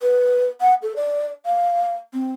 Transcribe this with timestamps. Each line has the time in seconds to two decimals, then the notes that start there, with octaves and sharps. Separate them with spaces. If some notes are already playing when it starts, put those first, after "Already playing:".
0.02 B4
0.61 F#5
0.83 A4
0.96 D5
1.46 F5
2.14 C4